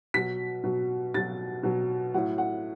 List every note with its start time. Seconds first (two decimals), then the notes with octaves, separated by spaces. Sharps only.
0.14 B2 F#3 B6
0.64 B2 F#3
1.14 B2 F#3 A6
1.63 B2 F#3
2.14 A2 F#3 F#5
2.38 F#5